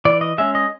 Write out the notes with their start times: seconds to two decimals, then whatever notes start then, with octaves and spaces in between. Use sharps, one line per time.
0.05 E3 D5
0.21 D#5
0.38 G#3 C#4 E5
0.55 D#5